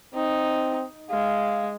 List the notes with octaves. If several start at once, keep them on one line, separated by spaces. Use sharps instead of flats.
C4 D#4
G#3 F5